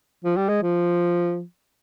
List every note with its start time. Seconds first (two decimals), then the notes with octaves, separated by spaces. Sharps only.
0.24 F3
0.37 G3
0.49 G#3
0.62 F3